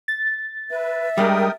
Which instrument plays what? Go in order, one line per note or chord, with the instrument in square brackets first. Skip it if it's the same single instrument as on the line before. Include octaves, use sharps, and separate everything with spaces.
[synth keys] A6
[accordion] B4 [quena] E5
[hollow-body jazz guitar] G3 G#3 D4 [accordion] A#4 G5 D#6